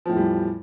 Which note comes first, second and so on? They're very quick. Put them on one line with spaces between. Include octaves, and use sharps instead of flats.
F3 A2 E2 G3